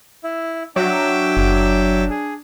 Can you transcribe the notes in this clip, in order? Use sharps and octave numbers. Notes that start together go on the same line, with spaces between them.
E4
F#3 D4 E5 G5 D6
F#1
G#4